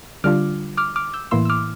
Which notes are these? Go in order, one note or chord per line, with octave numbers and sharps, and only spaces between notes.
D3 G3 D4 F4 D6 F6
D6 F6
D6 F6
E6 G6
A2 E3 A#3 E4 C6 E6
E6
D6 F6